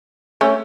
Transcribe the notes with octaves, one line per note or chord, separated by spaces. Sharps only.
A3 C#4